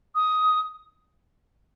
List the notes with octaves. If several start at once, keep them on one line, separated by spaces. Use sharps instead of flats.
D#6